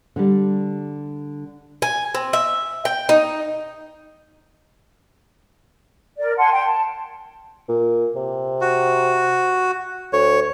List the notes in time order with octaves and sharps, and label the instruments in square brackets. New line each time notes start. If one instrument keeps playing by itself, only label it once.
[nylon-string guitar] D3 G3
[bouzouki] G#5
C4
E5
G5
D#4
[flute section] A#4 D5
F#5 G#5 A5 C6
G5 C6
A5
[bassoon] A#2
C3
[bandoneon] F#4
[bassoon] D2 [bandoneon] C#5